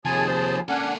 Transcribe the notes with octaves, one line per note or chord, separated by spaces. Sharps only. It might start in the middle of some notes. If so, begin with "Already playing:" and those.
D#2 C3 F3 G#4 G#5 A5
C5
A#3 C#4 D4 A4 F#5 G#5